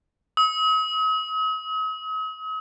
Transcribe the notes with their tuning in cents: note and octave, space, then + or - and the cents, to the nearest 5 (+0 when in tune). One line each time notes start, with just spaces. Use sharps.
D#6 +45